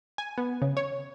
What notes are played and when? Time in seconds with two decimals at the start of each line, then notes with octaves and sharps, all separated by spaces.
0.18 G#5
0.38 B3
0.62 C#3
0.77 C#5